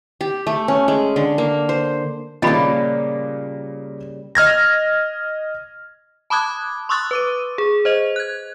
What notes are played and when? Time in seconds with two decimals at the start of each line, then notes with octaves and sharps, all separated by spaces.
0.21 G4
0.47 A3
0.68 C#4
0.88 G#3
1.16 D3
1.38 A#3
1.69 C5
2.42 A#2 C#3 F3 G3 A#3 D#5 B5
4.35 D#5 F6 G#6 A#6
6.30 A5 B5 D6 D#6 F#6 G#6
6.89 C6 C#6 D#6 E6 F#6 A6
7.11 B4 D6 D#7
7.58 G#4
7.85 C5 D#5 F7
8.16 F#6 G#6